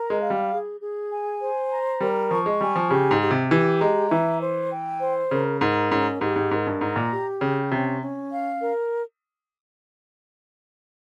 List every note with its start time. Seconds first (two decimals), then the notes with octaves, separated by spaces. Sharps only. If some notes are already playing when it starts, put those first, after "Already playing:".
Already playing: A#4 A#5
0.10 G#3
0.21 F5
0.30 G3
0.51 G#4
0.80 G#4
1.10 G#5
1.40 C5
1.71 A#5
2.00 G3 A#4
2.31 F3 C#6
2.46 G#3
2.60 G3 G#5
2.76 F3
2.90 C#3 G4
3.11 G#2
3.21 G4
3.31 C3
3.51 E3 G4
3.81 G#3 A#5
4.11 E3 E5
4.41 C5
4.71 G5
5.01 C5
5.30 C#3 A#4
5.61 G#2 A#4
5.91 G#2 C#4
6.21 G#2 G4
6.36 G#2
6.51 G#2 A#4
6.66 G2
6.81 G#2 A#5
6.96 A#2
7.11 G4
7.41 C#3 G5
7.71 C3 C#4
8.01 C#4
8.32 F5
8.61 A#4